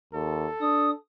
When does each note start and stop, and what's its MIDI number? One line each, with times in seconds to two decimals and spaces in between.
0.13 0.47 39
0.13 0.98 69
0.61 0.92 62
0.61 0.90 87